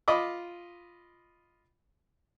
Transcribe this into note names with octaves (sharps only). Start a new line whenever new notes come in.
F4 D#5 B5 D6